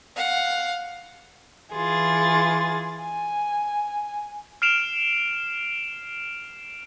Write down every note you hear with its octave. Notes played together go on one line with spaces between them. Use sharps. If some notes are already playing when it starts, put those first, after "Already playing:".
F5 F#5
E3 F4 G#4 A6
G#5
F6 C7 D7 E7 F7